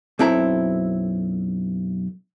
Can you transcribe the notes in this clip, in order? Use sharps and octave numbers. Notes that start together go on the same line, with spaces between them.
B1 F#2 C4 E4 A4 A#5